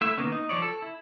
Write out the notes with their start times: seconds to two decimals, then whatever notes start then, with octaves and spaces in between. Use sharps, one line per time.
0.01 A3 E4 E5
0.17 D#3 A#3 B3 C#4
0.32 D#4
0.49 F3 F#3 C#5 D5
0.62 A4
0.82 E4